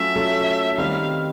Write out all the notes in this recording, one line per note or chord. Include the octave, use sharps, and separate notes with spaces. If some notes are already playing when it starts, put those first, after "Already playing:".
Already playing: F#3 A3 C#4 F4 A4 E5
F#3 A3 C#4 F4 A4
D#3 G3 C4 D#4 F5